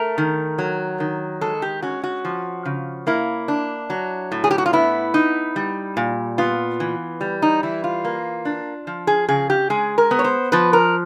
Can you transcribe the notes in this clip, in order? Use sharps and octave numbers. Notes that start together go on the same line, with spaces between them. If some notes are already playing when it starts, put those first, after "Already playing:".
Already playing: A3 A#4
D#3
F#3
D#3
G#3 A4
G4
C#4 F#4
F#4
F3
C#3
A#3 E4
D4
F#3
A2
G#4
G4
F#4
F4
B3 E4
D#4
G3
A#2
B3 F4
E3
G3
D#4
E3 E4
F4
A#3
D4
F3
G#4
C#3 G#4
G4
G#3 G#4
A#4
B3
C#5
C5
F3 B4
A#4